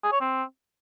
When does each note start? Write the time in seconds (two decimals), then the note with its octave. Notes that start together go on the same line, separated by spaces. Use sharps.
0.03 G#4
0.12 C#5
0.21 C4